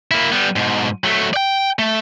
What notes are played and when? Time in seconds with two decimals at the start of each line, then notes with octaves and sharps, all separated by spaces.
0.11 A#3 E4
0.32 G3 B3
0.56 G#2 B2
1.04 F#3 A3
1.33 D5 G5
1.79 A3